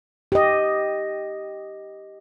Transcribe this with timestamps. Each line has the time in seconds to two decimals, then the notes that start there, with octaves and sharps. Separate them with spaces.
0.32 G4 D#5